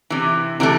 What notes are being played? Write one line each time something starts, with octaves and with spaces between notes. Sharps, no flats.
C3 E3
C3 E3 A3